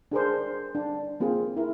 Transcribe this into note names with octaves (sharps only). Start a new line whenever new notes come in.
D4 G#4 A#4 C5
D4
A#3 C4 F4 G#4
E4 A#4